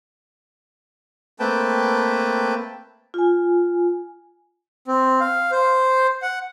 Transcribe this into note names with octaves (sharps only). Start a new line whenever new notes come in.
A3 A#3 C4 B4 G5 A5
F4 G#5
C4
F5
C5
F#5